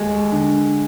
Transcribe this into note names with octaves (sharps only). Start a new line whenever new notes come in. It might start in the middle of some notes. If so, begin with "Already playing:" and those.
Already playing: D#2 G#3
D3